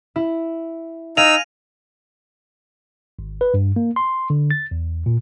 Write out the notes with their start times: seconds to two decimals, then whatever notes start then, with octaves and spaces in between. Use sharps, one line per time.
0.16 E4
1.17 D#4 F5 G#5 E6 A#6 D#7 F7
3.19 G#1
3.41 B4
3.54 G2
3.76 A#3
3.96 C6
4.30 D3
4.51 A6
4.71 E2
5.06 A#2